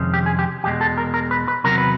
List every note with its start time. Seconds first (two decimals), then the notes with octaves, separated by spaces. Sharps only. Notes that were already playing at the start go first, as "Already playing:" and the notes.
Already playing: F2 C3 D#3 G#3 C#4
0.14 G4
0.26 G#4
0.39 G4
0.64 E2 B2 G#3 G4
0.81 A4
0.98 A#4
1.14 A#4
1.31 B4
1.48 B4
1.64 E2 C3 D#3 F#3 A#4
1.78 B4